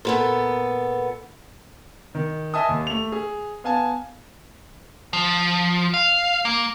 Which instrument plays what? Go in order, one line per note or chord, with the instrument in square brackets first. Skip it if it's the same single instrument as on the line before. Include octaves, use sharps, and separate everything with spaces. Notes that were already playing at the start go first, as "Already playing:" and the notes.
[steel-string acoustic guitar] A#2 B3 A4
[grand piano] D#3
D#5 E5 G#5 A5 D#6
D#2
A3 F7
G#4
B3 F5 G#5 A5
[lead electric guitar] F3
F5
A#3